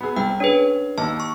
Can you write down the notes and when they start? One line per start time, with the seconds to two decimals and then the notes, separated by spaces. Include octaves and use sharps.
0.01 B3 G#4
0.16 C2 G5
0.40 C#4 D4 G#4 B4
0.98 D#2 A5 E6
1.20 C#6